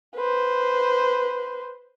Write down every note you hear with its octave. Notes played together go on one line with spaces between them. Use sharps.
B4 C5